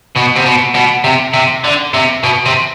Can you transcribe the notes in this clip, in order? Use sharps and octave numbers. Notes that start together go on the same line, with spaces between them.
B2
C3
B2
B2
C3
C3
D3
C3
B2
C3